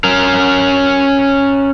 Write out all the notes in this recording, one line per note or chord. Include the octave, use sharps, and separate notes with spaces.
C#4 A#4